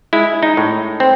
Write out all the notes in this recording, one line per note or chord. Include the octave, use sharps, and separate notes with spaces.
G#3 E4
D#4
A2
C4